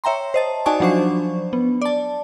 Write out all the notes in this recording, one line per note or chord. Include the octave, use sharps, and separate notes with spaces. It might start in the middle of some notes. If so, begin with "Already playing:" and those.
C#5 E5 G5 A#5 C6
C5 D#5 A5
D#4 F#4 D5 G#5 A5 C#6
F3 F#3 D4 C5 C#6
B3
D5 A5